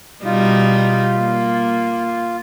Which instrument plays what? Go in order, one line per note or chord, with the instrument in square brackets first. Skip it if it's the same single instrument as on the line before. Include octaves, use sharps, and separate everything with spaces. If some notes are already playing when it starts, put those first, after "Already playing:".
[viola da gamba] B2 G3 D#4 [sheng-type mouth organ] F4
[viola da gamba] A#3